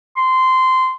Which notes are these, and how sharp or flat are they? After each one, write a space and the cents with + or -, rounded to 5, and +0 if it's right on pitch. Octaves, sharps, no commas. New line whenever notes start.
C6 -15